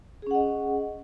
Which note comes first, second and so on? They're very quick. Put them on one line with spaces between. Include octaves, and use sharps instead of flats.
G#4 C#4 F#5 D#5